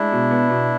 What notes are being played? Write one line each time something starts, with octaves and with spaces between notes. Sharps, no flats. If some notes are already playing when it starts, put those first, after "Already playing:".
Already playing: G#3 D4 E4
B2
B3
B2